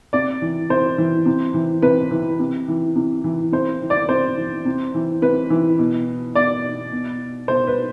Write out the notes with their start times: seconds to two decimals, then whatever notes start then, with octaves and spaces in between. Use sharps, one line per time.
0.13 C3 D5
0.42 E3
0.69 C3 C5
0.98 E3
1.26 C3
1.54 E3
1.82 C3 B4
2.11 E3
2.40 C3
2.68 E3
2.96 C3
3.24 E3
3.52 C3 C5
3.82 E3
3.90 D5
4.09 C3 C5
4.37 E3
4.65 C3
4.94 E3
5.22 C3 B4
5.50 E3
5.79 B2
6.35 B2 D5
6.92 B2
7.48 B2 C5
7.67 B4